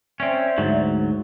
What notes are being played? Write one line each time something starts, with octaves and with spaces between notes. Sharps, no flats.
C4 C#4 C5 D5 E5
D2 G#2 F#3